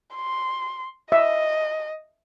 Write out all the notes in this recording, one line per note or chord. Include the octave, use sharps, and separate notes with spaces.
C6
D#5 E5